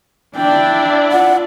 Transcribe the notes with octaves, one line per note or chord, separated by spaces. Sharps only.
D4 E4 D5 G5
F4 F#5